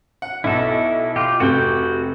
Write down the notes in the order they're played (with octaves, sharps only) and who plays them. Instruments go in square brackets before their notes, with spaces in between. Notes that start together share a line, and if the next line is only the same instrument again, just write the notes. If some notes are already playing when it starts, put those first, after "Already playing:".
[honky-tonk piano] F#5
[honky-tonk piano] B1 [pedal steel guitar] E4 A4
[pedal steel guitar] F4 G4
[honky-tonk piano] F1 C3 [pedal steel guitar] F#4 G4 G5